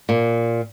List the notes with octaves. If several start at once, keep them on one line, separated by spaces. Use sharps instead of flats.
A#2